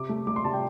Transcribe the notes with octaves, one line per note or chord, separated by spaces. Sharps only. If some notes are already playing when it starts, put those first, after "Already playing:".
Already playing: C3 D6
A3
A3 D6
C6
C3 A5
G5